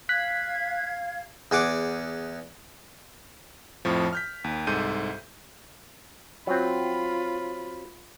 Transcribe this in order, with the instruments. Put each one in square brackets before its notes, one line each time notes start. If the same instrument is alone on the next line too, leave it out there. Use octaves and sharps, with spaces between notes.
[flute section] F5 G#6 [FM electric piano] F#6 B6
[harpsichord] E2 G#4 F#5 D6
[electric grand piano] F2 A2 F3
F6 G6 B6
D#2
C2 G#2 A4 G6 D#7
[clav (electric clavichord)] F#3 C4 [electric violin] F4 B5